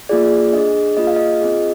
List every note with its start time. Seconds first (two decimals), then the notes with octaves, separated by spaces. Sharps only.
0.09 A#3 F4 G#4 D5
0.53 D4 G#4 D#5
0.97 A#3 F4 G#4 D#5
1.07 F5
1.17 D#5
1.41 C4 F4 G#4